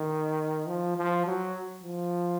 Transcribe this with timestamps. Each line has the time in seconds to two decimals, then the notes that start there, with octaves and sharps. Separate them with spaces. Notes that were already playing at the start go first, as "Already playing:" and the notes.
Already playing: D#3
0.68 F3
0.97 F3
1.26 F#3
1.83 F3